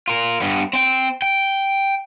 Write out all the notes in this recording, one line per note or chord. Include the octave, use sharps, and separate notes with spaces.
F4 A#4
G2 B3
C4 G5
G5